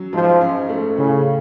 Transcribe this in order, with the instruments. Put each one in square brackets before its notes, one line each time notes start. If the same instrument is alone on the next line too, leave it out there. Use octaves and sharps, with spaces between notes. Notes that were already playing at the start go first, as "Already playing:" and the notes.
Already playing: [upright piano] F#3 C#4
[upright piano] G#2 [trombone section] F3
[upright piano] C#4
A3
[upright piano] A2 [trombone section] C#3